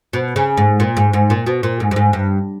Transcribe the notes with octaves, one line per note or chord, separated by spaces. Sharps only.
B2
C#3
G#2
A#2
G#2
G#2
A#2
B2
A#2
G#2
G2
G#2
G2